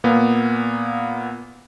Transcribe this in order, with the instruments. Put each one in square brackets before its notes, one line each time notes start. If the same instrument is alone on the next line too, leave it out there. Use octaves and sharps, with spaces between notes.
[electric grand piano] A#2 A#3 B3